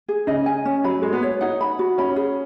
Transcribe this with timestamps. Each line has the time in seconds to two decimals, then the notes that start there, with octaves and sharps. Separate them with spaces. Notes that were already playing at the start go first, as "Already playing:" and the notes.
0.09 G#4
0.27 C#3 D#5
0.46 G#5
0.65 C#4
0.84 F#3 B5
1.02 G#3 F#4
1.13 B3
1.22 C#5
1.41 D#4 F#5
1.61 B5
1.79 F#4
1.98 C#4 B5
2.16 G#4